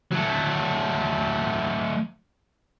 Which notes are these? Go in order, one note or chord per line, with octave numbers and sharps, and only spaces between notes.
F#3 A3